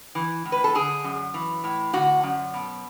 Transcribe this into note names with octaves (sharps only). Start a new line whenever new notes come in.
E3
A2
B4
A4
D3 G#4
F#2
E3
A2
D3 F#4
F#2
B2